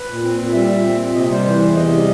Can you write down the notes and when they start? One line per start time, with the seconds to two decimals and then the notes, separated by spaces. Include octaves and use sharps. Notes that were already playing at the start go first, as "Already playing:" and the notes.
Already playing: B4
0.08 A#2
0.23 C4
0.39 A#2
0.53 G3 E5
0.69 A#2
0.85 C4
0.99 A#2
1.15 C3 D#5
1.30 G3 C5
1.46 E3 C5
1.61 E2 C5
1.76 C3 D#5
1.92 G3